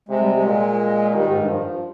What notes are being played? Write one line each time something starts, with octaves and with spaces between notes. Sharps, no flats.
C3 G#3
G3
G#3
A#2
D#3 G3
G#2
G2
F3